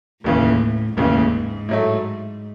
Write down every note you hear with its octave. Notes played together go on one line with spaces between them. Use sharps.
F1 D#2 A2 C#3 E3
F1 D#2 G#2 C#3 E3
A2 F#3 A3